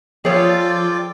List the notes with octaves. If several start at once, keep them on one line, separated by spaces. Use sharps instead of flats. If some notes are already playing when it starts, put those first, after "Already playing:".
F3 F4 G#4 A4 C#5 D5 G5